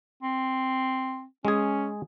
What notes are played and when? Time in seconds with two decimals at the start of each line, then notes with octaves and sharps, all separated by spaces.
0.23 C4
1.45 G#3 C#4 G#4